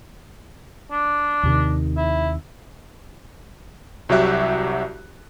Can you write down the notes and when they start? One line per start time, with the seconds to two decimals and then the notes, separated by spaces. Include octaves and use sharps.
0.91 D4
1.43 D#2 C3 D#3
1.97 E4
4.09 C2 F#3 F#4 G4 E5 F#6